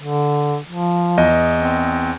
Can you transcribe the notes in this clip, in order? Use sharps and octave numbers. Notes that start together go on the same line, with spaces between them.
D3
F3
E2 D#5
C4